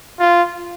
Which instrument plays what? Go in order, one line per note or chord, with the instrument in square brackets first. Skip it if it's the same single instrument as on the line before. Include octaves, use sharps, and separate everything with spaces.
[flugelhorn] F4